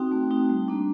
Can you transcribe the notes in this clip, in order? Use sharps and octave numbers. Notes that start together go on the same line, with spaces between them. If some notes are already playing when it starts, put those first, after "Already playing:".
Already playing: C4 D#4 F#4 G5
A3
C4 D#4 F#4
G3
A#3 D4